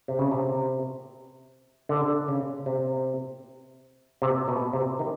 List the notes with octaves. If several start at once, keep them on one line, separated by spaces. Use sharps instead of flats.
C3
C#3
C3
D3
C#3
C3
C3
B2
C3
D#3